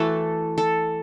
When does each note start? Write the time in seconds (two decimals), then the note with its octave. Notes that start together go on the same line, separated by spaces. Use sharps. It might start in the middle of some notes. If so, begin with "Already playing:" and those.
Already playing: E3 A3 F#4 A4
0.58 A4